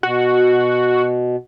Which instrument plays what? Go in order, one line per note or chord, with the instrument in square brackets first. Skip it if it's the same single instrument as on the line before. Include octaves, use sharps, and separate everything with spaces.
[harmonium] B2 [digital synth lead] F#4